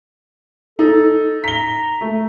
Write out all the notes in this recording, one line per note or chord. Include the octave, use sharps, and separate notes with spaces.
D#4 A4
A#5 B6 G7
A3